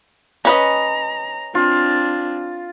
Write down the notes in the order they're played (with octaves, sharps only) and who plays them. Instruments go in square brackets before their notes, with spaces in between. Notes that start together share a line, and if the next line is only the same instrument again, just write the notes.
[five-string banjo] C#4 B4 D#5 [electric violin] A#5
[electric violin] C4 D4 [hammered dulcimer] F4